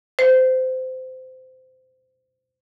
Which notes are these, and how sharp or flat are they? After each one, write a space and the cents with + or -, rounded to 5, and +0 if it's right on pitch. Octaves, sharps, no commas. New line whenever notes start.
C5 -20